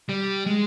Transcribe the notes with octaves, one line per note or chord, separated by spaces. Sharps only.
G3
G#3